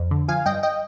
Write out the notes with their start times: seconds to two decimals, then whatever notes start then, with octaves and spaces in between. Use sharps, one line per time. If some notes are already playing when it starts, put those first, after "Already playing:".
Already playing: F2
0.11 D3
0.28 F3 F5 G#5
0.46 G2 D#5 G5
0.63 D#5 G5